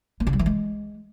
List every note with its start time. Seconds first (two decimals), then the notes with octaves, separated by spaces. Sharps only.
0.20 A#3
0.27 C#3
0.33 G3
0.39 E3
0.46 G#3